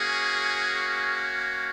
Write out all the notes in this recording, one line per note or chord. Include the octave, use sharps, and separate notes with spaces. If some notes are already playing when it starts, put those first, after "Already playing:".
Already playing: A#3 C#4 F#4 G#4